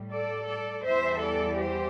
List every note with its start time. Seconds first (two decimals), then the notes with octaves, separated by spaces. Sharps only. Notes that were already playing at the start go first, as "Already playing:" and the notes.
Already playing: A2 G3
0.11 A4 D5
0.48 A4 D5
0.85 E2 E3 G3 C5 E5
1.21 A4 D5
1.58 G4 C5